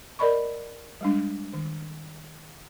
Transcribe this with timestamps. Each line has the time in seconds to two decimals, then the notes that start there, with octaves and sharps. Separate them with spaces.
0.19 A#4 D5 D#5 B5 C#6
1.01 G3 G#3 D4
1.53 D#3